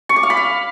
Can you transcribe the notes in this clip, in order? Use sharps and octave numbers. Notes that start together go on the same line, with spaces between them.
C#6
D6
F5
B5
F5